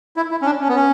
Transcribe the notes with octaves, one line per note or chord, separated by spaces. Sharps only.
E4
E4
C#4
D4
C#4
B3
C#4